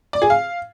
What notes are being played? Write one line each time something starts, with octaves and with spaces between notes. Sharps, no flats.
D5
G#4
F5